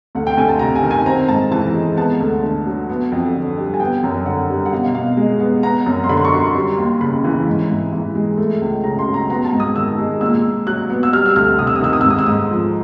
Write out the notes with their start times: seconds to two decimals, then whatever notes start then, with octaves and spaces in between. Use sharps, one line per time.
0.15 D2 F#5
0.27 G5
0.37 D2 G#5
0.49 A5
0.59 C3 A#5
0.76 G#5
0.83 D#3
0.91 G#5
1.06 C4 A#5
1.28 G#2 A5
1.51 E3 A5
1.74 G#3
1.97 B3 A5
2.20 D2
2.43 D3
2.66 F#3
2.89 B3
3.12 F2
3.35 D3
3.58 G3
3.74 G#5
3.80 B3 G5
4.04 F#2
4.26 D3 F#5
4.49 G3
4.65 F#5
4.72 B2 F5
4.95 B2 F5
5.17 G#3
5.40 B3
5.63 B3 A#5
5.86 F#2
6.04 C6
6.09 D3 B5
6.17 C6
6.25 C#6
6.32 F#3
6.40 C6
6.55 G3
6.78 D#2
7.01 C#3 B5
7.24 E3
7.47 G#2
7.70 G#2
7.93 E3
8.15 G#3
8.38 A3
8.61 C#2
8.84 C#3 A#5
8.99 C6
9.06 F#3
9.14 A#5
9.30 B3 A#5
9.45 A5
9.53 G#2
9.60 D#6
9.76 D#3 E6
9.98 G#3
10.21 A#2 E6
10.44 A#2
10.67 F#3 F#6
10.90 B3
11.03 E6
11.13 G3 F6
11.26 E6
11.36 D2 F6
11.59 C3 D#6
11.67 E6
11.76 D#6
11.81 D#3 E6
11.93 D#6
12.01 G#2 E6
12.10 D#6
12.19 E6
12.26 G#2 D#6
12.51 F3